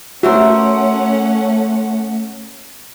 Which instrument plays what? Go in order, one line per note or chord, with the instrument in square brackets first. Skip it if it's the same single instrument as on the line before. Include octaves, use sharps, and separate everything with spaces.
[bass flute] A3 [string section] C#4 F#5 [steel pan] F#4 [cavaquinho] A#4 C5 E5